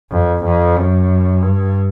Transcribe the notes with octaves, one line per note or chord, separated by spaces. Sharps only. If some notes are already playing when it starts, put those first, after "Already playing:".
F2
F2
F#2
G2